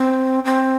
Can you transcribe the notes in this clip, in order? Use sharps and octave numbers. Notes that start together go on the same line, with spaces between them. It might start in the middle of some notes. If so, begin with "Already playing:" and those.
Already playing: C4
C4